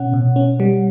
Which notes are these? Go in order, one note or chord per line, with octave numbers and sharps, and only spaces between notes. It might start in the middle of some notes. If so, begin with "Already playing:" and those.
Already playing: B2 C#4 F#5
B2
C#4
G3